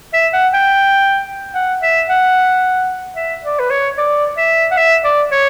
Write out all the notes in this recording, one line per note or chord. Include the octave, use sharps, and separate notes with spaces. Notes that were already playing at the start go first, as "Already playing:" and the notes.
E5
F#5
G5
F#5
E5
F#5
E5
D5
B4
C#5
D5
E5
F#5
E5
D5
C#5